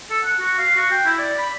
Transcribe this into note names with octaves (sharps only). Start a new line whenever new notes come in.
A4
F#5
F#4
F5
F#4
G5
E4
D5
B5